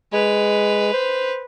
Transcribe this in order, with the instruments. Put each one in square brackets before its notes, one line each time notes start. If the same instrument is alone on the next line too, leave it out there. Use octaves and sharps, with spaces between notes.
[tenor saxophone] G#3 [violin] B4 F7
[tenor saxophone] C5